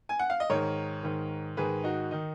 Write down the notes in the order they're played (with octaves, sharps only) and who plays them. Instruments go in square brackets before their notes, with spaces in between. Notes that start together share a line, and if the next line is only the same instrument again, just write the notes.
[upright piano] G#5
F#5
F5
D#5
G#2 D#3 A#4 C#5
G#2 D#3
G#2 D#3 G#4 B4
D#4 F#4
D#3 D#4